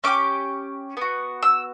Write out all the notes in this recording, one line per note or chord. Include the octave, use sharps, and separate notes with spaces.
C#4 G4 D6
B3 F#4
E6